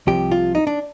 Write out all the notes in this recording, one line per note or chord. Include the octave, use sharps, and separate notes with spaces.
C2 C3 F3 G4
F4
D#4
D4